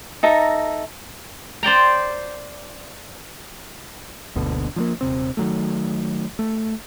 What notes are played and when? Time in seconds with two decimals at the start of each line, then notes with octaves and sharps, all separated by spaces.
0.23 D#4 A4 E5 A#5
1.63 C5 D5 G5 A#5
4.35 F#1 D2 B2 D3
4.76 F3 F#3 A#3
5.01 D#1 C3 C4
5.37 D#3 F#3 A3
6.39 A3